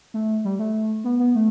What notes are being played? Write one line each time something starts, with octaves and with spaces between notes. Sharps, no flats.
A3
G3
A3
B3
B3
A3